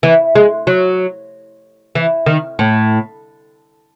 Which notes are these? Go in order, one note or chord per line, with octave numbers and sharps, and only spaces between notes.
E3
G#3
F#3
E3
D#3
A2